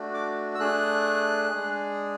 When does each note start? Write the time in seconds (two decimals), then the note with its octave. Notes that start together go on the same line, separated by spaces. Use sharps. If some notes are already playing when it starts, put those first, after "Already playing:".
Already playing: A3 D4 F#4
0.14 D6
0.55 E6
0.59 A3 D4 G#4 F#6
1.50 G#3 D4 G#4